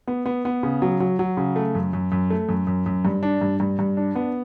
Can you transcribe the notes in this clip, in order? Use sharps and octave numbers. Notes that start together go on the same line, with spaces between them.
B3
B3
B3
C#3
F#3
F#3
F#3
C#3
A3
F#2
F#2
F#2
A3
F#2
F#2
F#2
G2
D4
G2
G2
G2
D4
B3